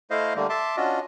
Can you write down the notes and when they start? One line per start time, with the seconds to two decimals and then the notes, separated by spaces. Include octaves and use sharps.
0.11 A3 E4 C5 D#5 F5
0.36 D3 G3 A3 A#3
0.50 E5 A5 C6 D6
0.77 C#4 D4 F4 F#4 D#5